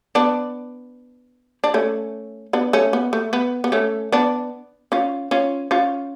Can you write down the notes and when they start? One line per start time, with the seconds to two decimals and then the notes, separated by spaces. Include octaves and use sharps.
0.15 B3 D4
1.64 D4
1.74 A3 C#4
2.53 B3 D4
2.73 A3 C#4
2.93 B3
3.13 A3
3.33 B3
3.64 B3
3.72 A3 C#4
4.12 B3 D4
4.92 C#4 F4
5.31 C#4 F4
5.71 C#4 F4